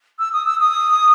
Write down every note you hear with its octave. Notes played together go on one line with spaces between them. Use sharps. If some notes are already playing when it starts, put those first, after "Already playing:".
E6
D#6
E6
D#6